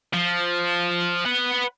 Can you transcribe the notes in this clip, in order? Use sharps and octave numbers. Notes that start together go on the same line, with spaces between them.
F3
B4 F#5